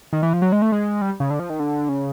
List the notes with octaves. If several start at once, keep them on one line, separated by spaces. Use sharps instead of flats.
D#3
E3
F3
F#3
G#3
A3
G#3
G3
C#3
D3
F3
D#3
D3
C#3